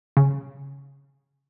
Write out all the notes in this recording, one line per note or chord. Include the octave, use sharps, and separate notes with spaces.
C#3